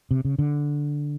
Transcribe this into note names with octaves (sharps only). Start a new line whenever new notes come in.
C3
C#3
D3